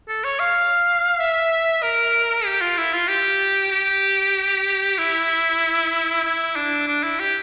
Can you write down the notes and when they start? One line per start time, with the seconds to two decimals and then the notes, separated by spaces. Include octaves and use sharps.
0.08 A4
0.24 C#5
0.40 F5
1.19 E5
1.83 A#4
2.45 G4
2.61 F4
2.77 E4
2.93 F4
3.08 G4
3.71 G4
4.98 E4
6.24 E4
6.56 D4
6.88 D4
7.04 E4
7.19 G4